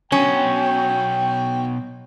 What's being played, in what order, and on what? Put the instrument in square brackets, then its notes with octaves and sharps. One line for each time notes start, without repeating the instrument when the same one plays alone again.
[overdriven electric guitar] B2 F#3 [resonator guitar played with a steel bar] C#4 [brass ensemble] G5